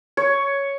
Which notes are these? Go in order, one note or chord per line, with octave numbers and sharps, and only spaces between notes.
C#5